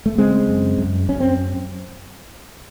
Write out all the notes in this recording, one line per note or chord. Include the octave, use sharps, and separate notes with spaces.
A3
C#3 G#3 C4
F#2
F#2
F#2 C#4
C4